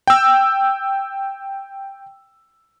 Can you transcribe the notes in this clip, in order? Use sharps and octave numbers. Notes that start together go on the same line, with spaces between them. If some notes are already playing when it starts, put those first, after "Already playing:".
G5 E6